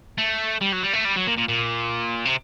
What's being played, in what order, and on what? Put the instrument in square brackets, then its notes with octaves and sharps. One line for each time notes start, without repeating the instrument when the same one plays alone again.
[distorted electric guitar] A3
G3
F#3
G3
A3
G3
F#3
A#2
A#2
A#2
C3